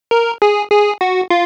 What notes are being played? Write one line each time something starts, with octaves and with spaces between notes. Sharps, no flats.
A#4
G#4
G#4
F#4
F4